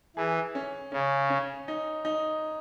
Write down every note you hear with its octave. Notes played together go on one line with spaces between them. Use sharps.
E3 G#4
C#4
C#3 C#4
C#4
D#4
D#4